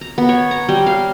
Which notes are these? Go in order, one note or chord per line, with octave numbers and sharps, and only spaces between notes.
A#5
B3
C#5
A#5
G3
F5